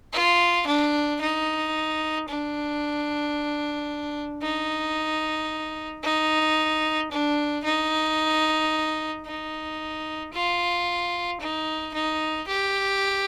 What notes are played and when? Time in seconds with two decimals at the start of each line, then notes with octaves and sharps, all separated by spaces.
0.13 F4
0.67 D4
1.21 D#4
2.28 D4
4.42 D#4
6.04 D#4
7.11 D4
7.64 D#4
9.26 D#4
10.34 F4
11.41 D#4
11.94 D#4
12.48 G4